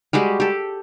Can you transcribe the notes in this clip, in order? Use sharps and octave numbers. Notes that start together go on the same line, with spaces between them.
G3 G#3 F#4 G4
G4 A4